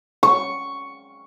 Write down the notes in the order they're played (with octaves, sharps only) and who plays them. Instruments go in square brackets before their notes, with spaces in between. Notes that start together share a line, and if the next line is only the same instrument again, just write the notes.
[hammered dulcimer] C#6